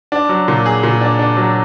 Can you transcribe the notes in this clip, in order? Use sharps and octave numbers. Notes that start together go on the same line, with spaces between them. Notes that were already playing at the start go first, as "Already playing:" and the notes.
D4
F#3
A#2
G#4
A#2
D4
D4
F#3